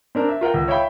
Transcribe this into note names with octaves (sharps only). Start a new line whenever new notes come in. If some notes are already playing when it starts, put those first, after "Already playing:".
C4 D4 A#4
E5
F4 A#4 F#5 G5
C#2
C#5 E5 F5 G5 B5